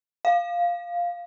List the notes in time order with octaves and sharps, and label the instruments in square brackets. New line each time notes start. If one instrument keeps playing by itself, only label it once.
[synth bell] F5